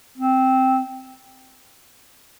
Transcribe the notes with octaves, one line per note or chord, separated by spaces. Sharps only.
C4